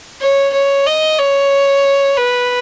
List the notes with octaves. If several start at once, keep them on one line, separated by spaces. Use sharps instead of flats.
C#5
C#5
D#5
C#5
B4